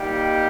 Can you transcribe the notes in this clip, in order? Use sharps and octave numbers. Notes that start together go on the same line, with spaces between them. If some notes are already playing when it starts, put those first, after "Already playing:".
Already playing: G3 A#3 D#4 G4